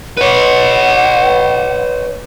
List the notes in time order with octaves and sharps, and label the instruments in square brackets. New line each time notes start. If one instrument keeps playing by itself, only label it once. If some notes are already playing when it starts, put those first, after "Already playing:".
[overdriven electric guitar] B4 C#5 [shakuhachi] F#5